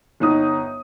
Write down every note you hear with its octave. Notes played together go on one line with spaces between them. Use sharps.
G1 D#4 D#6